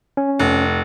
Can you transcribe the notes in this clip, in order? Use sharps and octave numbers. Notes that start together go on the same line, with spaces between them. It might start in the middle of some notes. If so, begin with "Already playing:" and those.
C#4
F1